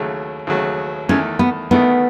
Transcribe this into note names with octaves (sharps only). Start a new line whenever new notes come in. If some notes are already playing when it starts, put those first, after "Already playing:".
Already playing: D#2 C#3 F#3 A3
D#2 C#3 F#3 A3
E2 D#3 A3 C#4
B3
E2 D#3 A3 B3